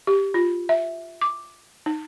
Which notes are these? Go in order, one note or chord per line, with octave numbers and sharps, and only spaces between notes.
G4
F4
E5
D6
D#4